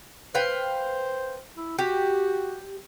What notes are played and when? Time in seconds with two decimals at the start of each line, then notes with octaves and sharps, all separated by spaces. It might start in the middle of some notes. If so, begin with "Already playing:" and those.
0.35 B4 C5 F5 G5
1.57 E4
1.79 F#4 G4